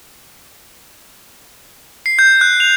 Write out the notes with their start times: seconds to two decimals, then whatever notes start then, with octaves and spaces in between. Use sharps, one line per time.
2.06 C7
2.19 G6
2.41 F#6
2.60 F7